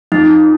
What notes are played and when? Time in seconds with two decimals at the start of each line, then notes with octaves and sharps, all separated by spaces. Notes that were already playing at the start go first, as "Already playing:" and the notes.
0.12 F2 D#4